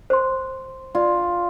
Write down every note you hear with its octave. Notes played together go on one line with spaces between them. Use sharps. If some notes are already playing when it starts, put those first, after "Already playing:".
C5 C6
F4 D5